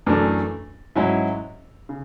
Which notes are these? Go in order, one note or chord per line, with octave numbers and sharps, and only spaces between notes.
F#2 E3 A3 D4
G#2 F#3 C#4 E4
C#3